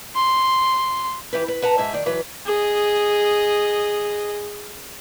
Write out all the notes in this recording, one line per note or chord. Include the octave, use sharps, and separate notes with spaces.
C6
E3 G4 B4
B4
B4 F#5 A5 A#5
G#2 G#4 E5
D#3 D5
E3 F#3 B4
G#4 D#5